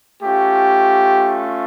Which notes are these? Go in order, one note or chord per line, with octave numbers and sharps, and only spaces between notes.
A3 C#4 F4 G4